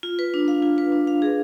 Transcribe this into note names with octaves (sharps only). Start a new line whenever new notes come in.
F4
B4
D4
F5
F4
B4
D4
F5
G#4